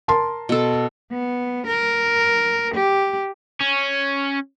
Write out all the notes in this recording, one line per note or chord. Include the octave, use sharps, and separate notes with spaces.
A#4 A5 C6
B2 A4
B3
A#4
G4
C#4